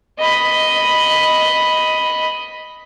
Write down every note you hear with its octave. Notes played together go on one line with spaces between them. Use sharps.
D#5 B5